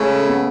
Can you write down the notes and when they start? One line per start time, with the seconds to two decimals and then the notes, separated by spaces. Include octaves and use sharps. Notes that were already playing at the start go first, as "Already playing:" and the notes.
Already playing: C#3 G#3 A3 C#4 E4 A4
0.29 B3